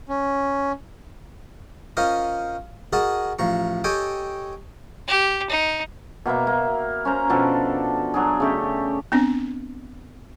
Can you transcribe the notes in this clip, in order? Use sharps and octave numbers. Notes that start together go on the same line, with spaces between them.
C#4
C#4 F4 A#4 C5 D#5
F#4 G#4 A#4 D#5 A5
A1 F3 A#5 C#6
G4 A4 C#5 D#5 G5 G#5
G4
D#4
B2 A#3 B4 E5
A#3
C#4 C5 A#5
B2 F3 D4 A4
F#3 D4 G#4
C#3 A3 G4
B3 C4 D4